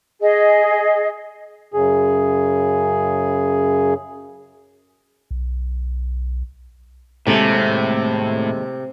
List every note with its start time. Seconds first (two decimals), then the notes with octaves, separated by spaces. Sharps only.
0.21 G#4 D#5
1.74 F#2 C#3 G#4
5.31 B1
7.27 D#2 A2 C3 G#3 A3 A4